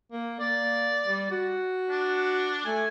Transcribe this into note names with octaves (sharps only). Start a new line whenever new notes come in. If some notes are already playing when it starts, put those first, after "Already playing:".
A#3
A#3 D5
G3
F#4
D4
A3 G#5